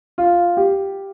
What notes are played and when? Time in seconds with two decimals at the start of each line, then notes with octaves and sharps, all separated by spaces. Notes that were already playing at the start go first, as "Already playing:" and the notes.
0.18 F4
0.57 G4